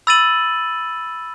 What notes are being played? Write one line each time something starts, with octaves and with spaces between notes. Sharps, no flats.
B5 E6 A6 D#7 F#7